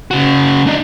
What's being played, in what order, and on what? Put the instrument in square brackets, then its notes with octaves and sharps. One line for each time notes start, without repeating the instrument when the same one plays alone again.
[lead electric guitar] C#3 F#4
D4 D#4